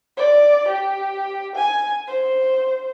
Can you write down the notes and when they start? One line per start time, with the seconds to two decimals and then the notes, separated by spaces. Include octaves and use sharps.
0.17 D5
0.68 G4
1.55 G#5
2.08 C5